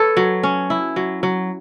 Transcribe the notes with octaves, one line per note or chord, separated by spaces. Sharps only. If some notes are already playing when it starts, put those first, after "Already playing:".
Already playing: A4 B4 C#5
F#3
C#4
E4
F#3
F#3